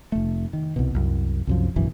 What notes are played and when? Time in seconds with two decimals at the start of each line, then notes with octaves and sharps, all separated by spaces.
0.12 F1 A3
0.53 D#3
0.76 C2 B2
0.95 C2 F#2
1.47 C2 F#2 F3
1.76 F1 A#1 F#2 E3